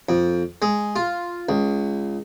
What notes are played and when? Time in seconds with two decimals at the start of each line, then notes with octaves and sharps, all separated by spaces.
0.09 F2
0.62 G#3
0.96 F4
1.49 C#2